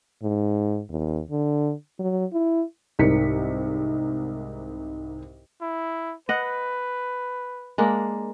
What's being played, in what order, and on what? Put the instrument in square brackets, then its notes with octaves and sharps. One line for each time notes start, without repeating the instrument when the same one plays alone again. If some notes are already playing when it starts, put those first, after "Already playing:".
[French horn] G#2
D#2
D3
F#3
E4
[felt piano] C2 G#2 A#4 B6 C#7
[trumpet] E4
[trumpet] B4 [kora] D#5 F#5
[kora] G#3 A#3 D4